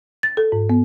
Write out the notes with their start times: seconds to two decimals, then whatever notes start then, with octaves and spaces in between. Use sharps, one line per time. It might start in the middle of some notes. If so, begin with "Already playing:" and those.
0.23 A6
0.37 A4
0.52 G#2
0.70 B3